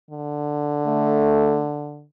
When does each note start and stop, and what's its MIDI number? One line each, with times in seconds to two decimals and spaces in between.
0.11 2.04 50
0.86 1.65 57